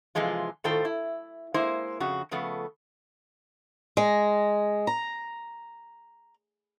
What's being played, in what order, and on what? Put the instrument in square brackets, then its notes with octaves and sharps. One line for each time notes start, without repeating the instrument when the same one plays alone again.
[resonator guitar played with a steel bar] C3 E3 F3 G#3 F4
A2 D#3 F4 A4 C5 G5
E4
G#3 A#3 E4 C5
F2 C#3 F#4
C#3 F3 A3 B3
[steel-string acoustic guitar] G#3
A#5